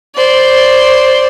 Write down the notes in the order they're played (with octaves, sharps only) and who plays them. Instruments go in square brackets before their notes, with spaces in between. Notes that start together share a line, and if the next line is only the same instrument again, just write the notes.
[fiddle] C5 D5